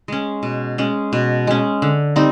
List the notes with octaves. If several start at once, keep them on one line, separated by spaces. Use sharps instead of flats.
G#3 C#4
B2
G#3 C#4
B2
G#3 C#4
D3
G3 C4 D#4